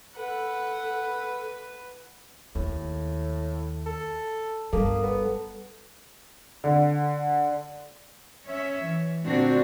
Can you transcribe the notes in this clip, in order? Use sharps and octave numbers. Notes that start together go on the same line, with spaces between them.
A4 B4 F#5
D#2 A2
A4
G1 G3 A#3 A4
B3
D3
C#4 C#5 E5
E3
A#2 D3 A3 C4 D4 F#4